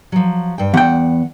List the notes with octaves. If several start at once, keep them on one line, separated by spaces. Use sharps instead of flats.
F3 F#3
G2 G5
E2 F#5 G5